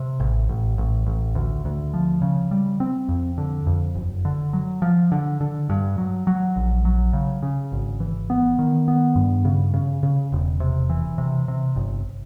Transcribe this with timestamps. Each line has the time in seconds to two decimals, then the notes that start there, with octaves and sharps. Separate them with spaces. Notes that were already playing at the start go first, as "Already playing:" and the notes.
Already playing: C3
0.20 A1
0.49 A1
0.78 A1
1.06 A1
1.35 D2
1.65 D2
1.94 F3
2.22 C#3
2.51 G3
2.80 C4
3.09 F2
3.38 D3
3.67 F2
3.95 F#1
4.25 D3
4.53 F#3
4.82 F3
5.12 D3
5.41 D3
5.69 G2
5.98 F#3
6.27 F#3
6.56 A#1
6.85 F#3
7.13 C#3
7.42 C#3
7.72 G#1
8.00 E3
8.30 B3
8.59 D#3
8.88 B3
9.16 G2
9.45 C#3
9.74 C#3
10.03 C#3
10.32 E1
10.60 C3
10.90 E3
11.18 C3
11.48 C3
11.76 G1